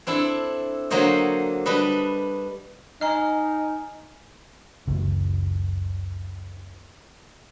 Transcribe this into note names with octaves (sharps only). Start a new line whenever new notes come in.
C4 D4 E4 A4
D3 F#3 A#3 C5 C#5 D#5
G3 D4 B4 D#5
D#4 D#5 G#5 A#5 F6
F#1 C#2